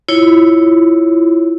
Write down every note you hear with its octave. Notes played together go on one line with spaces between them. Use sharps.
E4 F4 C#5